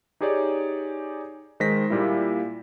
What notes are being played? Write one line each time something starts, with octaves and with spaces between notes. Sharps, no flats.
D#4 G4 G#4 C#5 D5
D#3 G#3 C5 A#6 B6
A#2 G3 A#3 E4